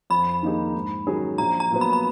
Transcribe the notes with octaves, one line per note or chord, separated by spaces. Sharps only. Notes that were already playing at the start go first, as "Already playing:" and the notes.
F2 B5
D#3 A#3 D#4 G#4
G#2
D#3 F#3 C#4 G#4
A#1 A#5
A#5
A#2 F#3 B3
B5
B5